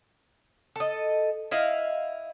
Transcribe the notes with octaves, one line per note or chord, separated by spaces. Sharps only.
A4 D#5
E4 D#5 F5